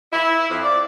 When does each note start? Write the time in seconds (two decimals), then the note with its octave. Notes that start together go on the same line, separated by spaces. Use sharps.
0.13 E4
0.50 F2
0.63 D5